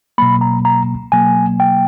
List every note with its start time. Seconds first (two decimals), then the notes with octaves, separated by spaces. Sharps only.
0.18 B2 F#3 A#3 B5
0.41 A#5
0.65 A#5
1.12 B2 F#3 A#3 G#5
1.60 G5